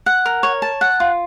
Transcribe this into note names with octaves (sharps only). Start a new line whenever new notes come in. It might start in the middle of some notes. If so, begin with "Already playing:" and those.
F#5
A#4
C#5
A5
F#5
F4